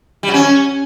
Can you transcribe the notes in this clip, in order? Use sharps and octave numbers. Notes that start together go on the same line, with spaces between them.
G3
F#3
C#4